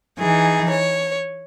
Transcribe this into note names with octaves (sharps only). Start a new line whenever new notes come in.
E3 D#4 G#4
C#5